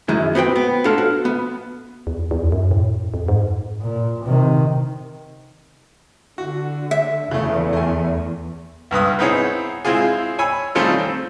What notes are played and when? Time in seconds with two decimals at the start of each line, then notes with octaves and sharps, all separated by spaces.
0.08 F#2 D#3 G#3 E4
0.35 B3 C4 F#4 G5
0.56 B3
0.85 D4 F4 A4 A#4 C#5
0.98 F#4
1.25 B3
2.07 E2
2.31 E2
2.52 F#2
2.71 A2
3.14 F2
3.28 G#2
3.82 A#2
4.24 C3 D#3
6.38 D3 F#4
6.91 E5
7.31 E2 C#3 A3
7.73 A3 G#5
8.91 C#2 G2 B4 D#6
9.19 B3 C4 D#4 E4 G#4 C#5
9.85 G#3 C4 E4 F4 G#4
10.39 C#5 G#5 B5 E6
10.75 D#3 G3 A3 C4 C#4 F4
10.98 C4